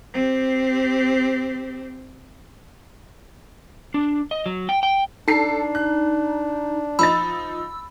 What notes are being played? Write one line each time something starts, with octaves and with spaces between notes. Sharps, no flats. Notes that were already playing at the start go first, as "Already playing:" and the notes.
C4 G4
D4
D#5
F#3
G5
G5
D4 D#4 A4 C7
F#6
F3 D#4 B5 E6 A6